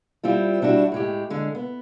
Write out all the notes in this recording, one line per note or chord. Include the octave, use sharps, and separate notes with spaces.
G3 C4 E4 F4
G3 D4 E4 F#4
A2 G#3 G4
D3 G#3
B3